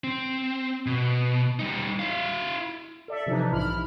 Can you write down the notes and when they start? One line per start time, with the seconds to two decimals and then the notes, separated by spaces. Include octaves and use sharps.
0.04 C4
0.86 B2
1.59 G3 D#4
1.99 E4 F5
3.08 A4 D5 E5
3.26 C3 E3 F3 D4 D#4
3.52 B1 G#2 E4 B5 F6